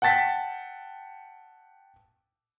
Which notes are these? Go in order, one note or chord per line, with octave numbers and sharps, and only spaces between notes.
F#5 G5 A5 A6 B6